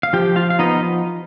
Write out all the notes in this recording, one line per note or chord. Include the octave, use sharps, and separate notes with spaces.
F5
F3 G4 G5
F4 F5
F5
B3 D#4 D#5